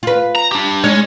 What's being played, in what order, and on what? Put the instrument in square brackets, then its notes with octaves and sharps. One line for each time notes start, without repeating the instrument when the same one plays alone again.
[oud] F4 B4
[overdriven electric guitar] A#5
D4 G4
[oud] G#3 D#4 [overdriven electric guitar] C#4 C#5